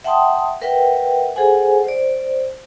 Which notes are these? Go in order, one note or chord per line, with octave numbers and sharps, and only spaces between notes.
E5 F#5 G5 A5 C6 D#6
A#4 B4 E5 F#5 G5
G#4 A4 C5 F#5 G#5
C5 D5